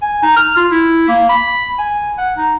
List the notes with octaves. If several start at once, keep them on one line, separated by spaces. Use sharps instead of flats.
G#5
D#4
F6
F4
E4
A#3
B5
G#5
F#5
D#4